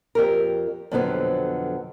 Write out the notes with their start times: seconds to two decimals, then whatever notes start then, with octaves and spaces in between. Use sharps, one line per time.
0.15 F2 G4 A#4
0.91 F2 B2 D3 F#3 B3 C4